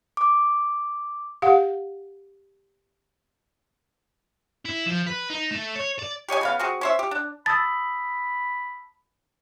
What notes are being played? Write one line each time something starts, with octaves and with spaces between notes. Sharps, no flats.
D6
G4 F5 F#5
E4
F3
B4
D#4
A3
C#5
D5
G4 C#5 D#5 G#5
C#3 B3 F5
C4 F#4 G#4
C#4 C5 E5
G4
D4
A5 B5 D#6 E6 A6